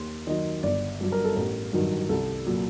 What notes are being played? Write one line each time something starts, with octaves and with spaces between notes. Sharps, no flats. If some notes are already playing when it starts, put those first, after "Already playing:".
Already playing: D#2 C6
D#3 F#3 D#5
G1 D5
G2 F#3
A#4
A4
A1 A#4
G2 D#3 F#3
C2 A4
A#2 F#3